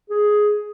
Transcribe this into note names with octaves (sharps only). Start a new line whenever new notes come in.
G#4